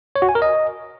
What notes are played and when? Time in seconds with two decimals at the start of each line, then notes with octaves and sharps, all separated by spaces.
0.16 C#5
0.22 F#4
0.29 G#5
0.35 A#4
0.42 D#5